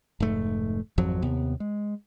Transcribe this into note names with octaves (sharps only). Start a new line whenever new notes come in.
F1 G#2 A3
G#1 F2 F3 F#3
D#2 C3 B3
G#3